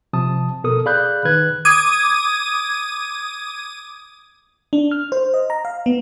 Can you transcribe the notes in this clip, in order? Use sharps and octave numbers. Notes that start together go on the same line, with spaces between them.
C3 F3 A5 D#6
B2 A4 A#4 D#6
G#4 D5 F5 B5 F#6 G6
D#3 B4 F#6 G#6
D6 D#6 G#6 D#7
D4
F6
C5
D#5
A#5
F5
B3